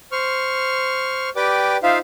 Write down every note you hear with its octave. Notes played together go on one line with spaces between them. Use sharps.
C5 C#6 F6
G4 B4 D5 G5 D6
D#4 F4 C5 E5 F5